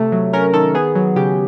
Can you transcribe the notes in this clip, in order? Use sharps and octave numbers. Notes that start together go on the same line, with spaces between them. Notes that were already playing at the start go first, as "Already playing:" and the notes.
Already playing: C3 A3
F#3
C#4 A#4
D#3 A4
B3 G#4
F#3
C#3 G4